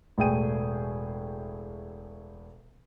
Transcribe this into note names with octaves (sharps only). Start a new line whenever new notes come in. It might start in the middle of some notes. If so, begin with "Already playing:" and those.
E1 A2 A3 G#4 G5 D#7